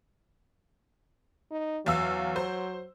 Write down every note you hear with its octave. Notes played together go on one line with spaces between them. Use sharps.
D#4
E2 F#3 F5 E6
C5